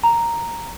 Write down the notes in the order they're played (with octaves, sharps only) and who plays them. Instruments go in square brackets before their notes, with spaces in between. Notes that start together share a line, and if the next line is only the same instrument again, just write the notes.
[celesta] A#5